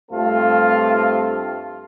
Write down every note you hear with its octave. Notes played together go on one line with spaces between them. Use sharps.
G2 A3 C4 F4 A4